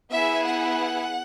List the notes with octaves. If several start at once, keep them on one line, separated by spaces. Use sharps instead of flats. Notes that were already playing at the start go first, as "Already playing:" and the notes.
B3 E4 G#4 E5
F#5